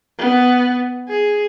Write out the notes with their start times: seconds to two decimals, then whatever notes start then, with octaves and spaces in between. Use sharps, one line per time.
0.19 B3
1.09 G#4